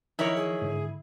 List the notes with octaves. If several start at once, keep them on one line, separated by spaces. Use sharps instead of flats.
D#3 F3 E4 A#4 C#5
G#4
G#2 D3